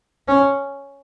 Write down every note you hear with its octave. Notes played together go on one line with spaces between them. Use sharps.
C#4